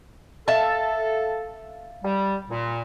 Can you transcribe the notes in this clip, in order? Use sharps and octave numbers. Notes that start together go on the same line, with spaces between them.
A4 E5 F5 A5
G3
A#2